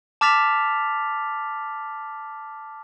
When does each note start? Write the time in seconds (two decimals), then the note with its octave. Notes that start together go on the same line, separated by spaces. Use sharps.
0.21 A5 D6 F6 A6 B6 F7